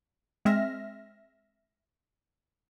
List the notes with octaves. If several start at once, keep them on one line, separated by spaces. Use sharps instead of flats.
G#3 C4 E5 F6 A#6